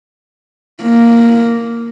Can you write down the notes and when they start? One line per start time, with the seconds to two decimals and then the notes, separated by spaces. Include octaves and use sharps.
0.83 A#3